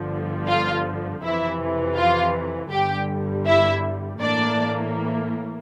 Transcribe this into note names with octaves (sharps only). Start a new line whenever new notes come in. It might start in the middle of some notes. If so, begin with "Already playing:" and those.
Already playing: G1 G2 D3 F3
F4 F5
F2 C3 E3 E4 E5
F4 F5
G1 G2 D3 G3 G4 G5
E4 E5
A2 E3 A#3 D4 D5